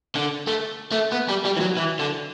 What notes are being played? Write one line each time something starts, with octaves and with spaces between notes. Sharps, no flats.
D3
A3
A3
B3
G3
G3
E3
F#3
E3
D3